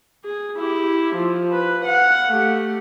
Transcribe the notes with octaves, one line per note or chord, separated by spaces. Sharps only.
G#4
E4 G4
F3
B4
F5 F#5
A3 G4